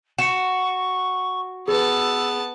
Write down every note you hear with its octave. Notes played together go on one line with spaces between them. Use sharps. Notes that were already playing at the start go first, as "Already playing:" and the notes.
F#4 C#6 C#7 E7
B3 G#4 B4 A5 E6